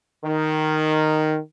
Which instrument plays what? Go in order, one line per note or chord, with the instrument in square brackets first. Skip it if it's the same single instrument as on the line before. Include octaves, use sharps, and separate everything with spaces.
[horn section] D#3